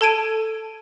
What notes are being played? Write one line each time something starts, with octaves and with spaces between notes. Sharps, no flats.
A4 A5 G#6 D7 D#7